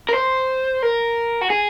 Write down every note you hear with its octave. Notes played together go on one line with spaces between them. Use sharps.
A#4
C5
A#4
F#4
G#4